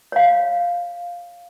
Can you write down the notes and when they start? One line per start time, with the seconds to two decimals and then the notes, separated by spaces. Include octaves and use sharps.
0.12 C#5 F5